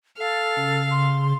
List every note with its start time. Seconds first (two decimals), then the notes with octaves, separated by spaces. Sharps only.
0.18 A4 F5
0.56 C#3
0.91 C6